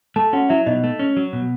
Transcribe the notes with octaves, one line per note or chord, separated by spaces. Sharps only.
A3 A4 A5
C#4 F#4 F#5
F#3 E4 E5
B2 D#4 D#5
A3
C#4
F#3
B2